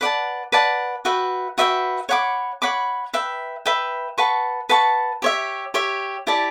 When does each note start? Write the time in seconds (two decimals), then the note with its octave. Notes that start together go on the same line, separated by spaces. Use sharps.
0.01 B4 D5 F#5 A5
0.52 B4 D5 F#5 A5
1.05 F#4 B4 E5 G5
1.58 F#4 B4 E5 G5
2.09 C#5 F#5 B5 D6
2.62 C#5 F#5 B5 D6
3.14 B4 E5 G5
3.66 B4 E5 G5
4.18 B4 F#5 A5 C#6
4.69 B4 F#5 A5 C#6
5.22 G4 C#5 E5
5.74 G4 C#5 E5
6.27 E4 G4 D5 A5